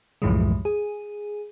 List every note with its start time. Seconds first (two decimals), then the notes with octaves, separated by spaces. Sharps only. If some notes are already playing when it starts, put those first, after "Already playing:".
0.22 C2 F#2 A2 E3 F3 G#3
0.65 G#4